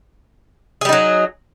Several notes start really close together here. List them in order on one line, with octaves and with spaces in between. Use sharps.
G#4 G3 D#4 F#3